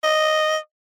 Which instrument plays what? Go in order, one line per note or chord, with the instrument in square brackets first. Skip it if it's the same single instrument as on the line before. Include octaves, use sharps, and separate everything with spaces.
[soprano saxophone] D#5